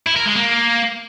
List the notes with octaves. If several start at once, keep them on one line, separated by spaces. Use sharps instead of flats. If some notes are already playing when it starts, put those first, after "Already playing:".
E4
A#4
G#3
A#3